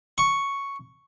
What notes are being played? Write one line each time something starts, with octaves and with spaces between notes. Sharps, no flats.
C#6